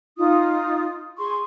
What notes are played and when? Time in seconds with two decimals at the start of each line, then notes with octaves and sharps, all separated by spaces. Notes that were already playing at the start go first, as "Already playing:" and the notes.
0.17 D#4 F4 D#6
1.18 G#4 C6 C#6